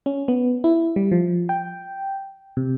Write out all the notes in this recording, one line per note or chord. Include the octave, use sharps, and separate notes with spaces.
C#4
B3
E4
G3
F3
G5
C3